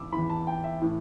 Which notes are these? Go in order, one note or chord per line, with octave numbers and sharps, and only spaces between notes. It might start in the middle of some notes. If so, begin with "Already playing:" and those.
Already playing: E2 E3 B5 D6 E6
E2 E3 B5
A5
G5
E5
A2 E3